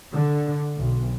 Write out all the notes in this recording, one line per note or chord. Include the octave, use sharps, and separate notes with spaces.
D3
B1